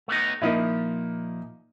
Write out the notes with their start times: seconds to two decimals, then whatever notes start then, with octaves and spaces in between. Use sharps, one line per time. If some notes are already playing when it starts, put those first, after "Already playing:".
0.08 A3 B3 D#4
0.42 A#2 F3 A#3 D#4 E4